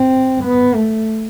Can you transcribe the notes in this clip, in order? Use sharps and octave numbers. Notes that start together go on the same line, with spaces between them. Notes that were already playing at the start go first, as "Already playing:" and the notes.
Already playing: C4
B3
A3